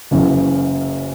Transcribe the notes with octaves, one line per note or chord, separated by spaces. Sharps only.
F#1 F#2 C#3 E3